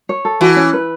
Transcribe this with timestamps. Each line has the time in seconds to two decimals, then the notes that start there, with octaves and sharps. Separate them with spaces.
0.09 C#5
0.25 A4
0.41 E3 F#4
0.56 C#4
0.73 B4